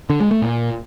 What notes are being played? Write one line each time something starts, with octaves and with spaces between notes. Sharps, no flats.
D3
G#3
A3
A#2